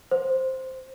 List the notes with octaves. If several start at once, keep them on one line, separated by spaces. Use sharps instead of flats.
C5